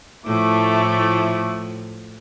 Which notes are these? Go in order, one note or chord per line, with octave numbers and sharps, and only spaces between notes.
A2 F3 A3 E4 D6